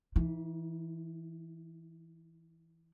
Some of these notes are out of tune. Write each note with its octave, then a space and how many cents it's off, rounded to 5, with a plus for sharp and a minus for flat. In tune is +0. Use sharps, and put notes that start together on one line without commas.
E3 +0 D#4 +35